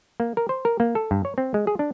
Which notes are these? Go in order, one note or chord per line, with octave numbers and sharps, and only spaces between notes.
A#3
A#4
C5
A#4
A#3
A4
G2
C#5
C4
G#3
G#4
D4